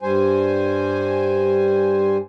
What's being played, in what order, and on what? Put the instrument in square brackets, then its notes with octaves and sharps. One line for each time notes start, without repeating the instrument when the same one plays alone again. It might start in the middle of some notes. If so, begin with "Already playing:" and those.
[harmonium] G2 G3 C5 G#5